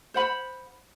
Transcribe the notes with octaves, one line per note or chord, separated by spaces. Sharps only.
C5 F#5 B5